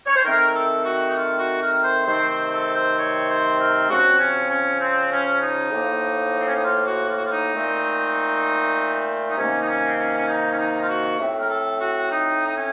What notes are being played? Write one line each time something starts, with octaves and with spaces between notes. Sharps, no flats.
C#5
C5
D#3 A3 C4 A#4
A4
F#4
D#4
F4
F#4
A#4
C5
C3 D#3 A3 C4 C5
C5
A4
C5
C#5
C5
A#4
C#3 F3 C4 F#4
C#4
C#4
C4
C#4
D#4
A2 F3 A#3
C4
C#4
D#4
F4
F#4
F4
F#4
F4
D#4
A#2 A3 C4
D#4
C3 D#3 A#3 C#4
D#4
C#4
C4
C#4
C#4
D#4
C#4
D#4
F4
F#4
A2 A3 C4
A#4
A4
F#4
D#4
D#4
C#4